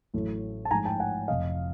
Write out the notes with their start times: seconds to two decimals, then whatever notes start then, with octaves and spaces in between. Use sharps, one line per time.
0.14 A1 A2 F#3 A3
0.65 A5
0.71 G#2 F3 A3 G#5 A#5
0.85 G5 A5
1.00 F#5 G#5
1.28 F1 F2 C3 F3 D#5 F5